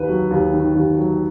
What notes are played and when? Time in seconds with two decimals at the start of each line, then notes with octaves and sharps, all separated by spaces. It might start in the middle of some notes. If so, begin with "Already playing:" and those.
Already playing: D#2 D#3 B4
0.08 F#3
0.31 D#2
0.53 D#3
0.76 D#2
0.97 F#3